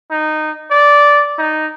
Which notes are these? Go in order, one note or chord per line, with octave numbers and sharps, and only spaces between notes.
D#4
D5
D#4